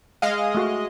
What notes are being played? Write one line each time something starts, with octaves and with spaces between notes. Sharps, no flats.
G#3 D#5 F5
A3 F#4